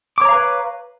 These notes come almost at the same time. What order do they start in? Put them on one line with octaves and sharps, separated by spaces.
D6 C#5 A#5 F5 B4